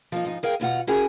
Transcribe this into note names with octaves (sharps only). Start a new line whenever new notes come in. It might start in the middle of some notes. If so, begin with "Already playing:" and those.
F3 A#3 D#4
G#2 F3 D#4
G#4 A#4 F5 G5
D#2 B2 F4 F#5
C#4 E4 F#4 G#4 A#4 G#5